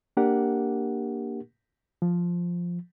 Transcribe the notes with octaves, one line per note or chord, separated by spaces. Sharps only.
A#3 D4 G4 A#4 F#5
F3